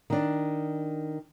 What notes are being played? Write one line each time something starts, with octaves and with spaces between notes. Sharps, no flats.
D#3 D4